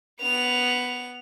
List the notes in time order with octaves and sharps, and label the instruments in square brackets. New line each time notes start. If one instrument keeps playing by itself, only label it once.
[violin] B3 F7